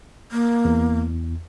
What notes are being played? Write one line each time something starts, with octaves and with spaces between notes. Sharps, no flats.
A#3
E2